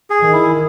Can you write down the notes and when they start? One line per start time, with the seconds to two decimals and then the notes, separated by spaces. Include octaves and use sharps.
0.10 G#4
0.21 D#3
0.33 E4